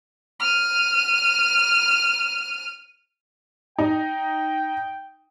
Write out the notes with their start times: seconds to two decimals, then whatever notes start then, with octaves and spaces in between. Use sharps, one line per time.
0.40 F6 D#7
3.79 D#4 G5